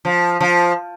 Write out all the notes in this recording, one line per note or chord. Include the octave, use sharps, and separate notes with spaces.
F3
F3